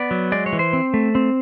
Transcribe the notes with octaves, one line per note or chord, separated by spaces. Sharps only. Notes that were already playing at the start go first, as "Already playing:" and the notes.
Already playing: B3 D5
F#3
G#3 D5
C#5
E3
C5
C4
A3
C4